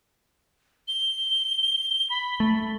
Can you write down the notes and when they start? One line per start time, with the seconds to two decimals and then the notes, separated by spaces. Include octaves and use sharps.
0.88 G7
2.10 B5
2.40 A3